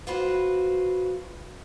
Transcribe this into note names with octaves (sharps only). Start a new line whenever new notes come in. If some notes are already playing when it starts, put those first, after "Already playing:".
F4 F#4 B4 C5